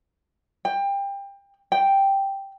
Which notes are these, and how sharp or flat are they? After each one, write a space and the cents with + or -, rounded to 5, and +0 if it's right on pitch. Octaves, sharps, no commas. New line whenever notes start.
G5 +25
G5 +0